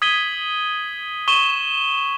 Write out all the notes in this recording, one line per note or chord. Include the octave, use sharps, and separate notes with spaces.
D#6 G#6 B6 D#7 G7
C#6 D#6 D#7 E7 G7